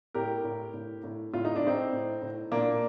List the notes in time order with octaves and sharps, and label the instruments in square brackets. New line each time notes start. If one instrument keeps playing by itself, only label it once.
[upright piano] A2 G4 A#4
A2
A2
A2
A2 F4
D#4
D4
A2 C4 D#4
A2
A2
A#2 A#3 D4